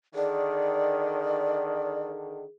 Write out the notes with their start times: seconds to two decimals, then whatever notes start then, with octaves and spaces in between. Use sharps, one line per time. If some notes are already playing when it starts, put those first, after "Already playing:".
0.15 D3 D#3 G#4 D5